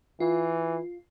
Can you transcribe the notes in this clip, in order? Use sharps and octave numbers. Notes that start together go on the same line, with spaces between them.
E3 F4